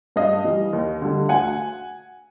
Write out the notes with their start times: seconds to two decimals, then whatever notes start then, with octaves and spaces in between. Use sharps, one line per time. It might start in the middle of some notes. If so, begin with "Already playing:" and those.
0.16 G2 D#5 F5
0.44 E3 G3
0.73 D#2
1.02 D3 G3
1.29 D2 F#5 G#5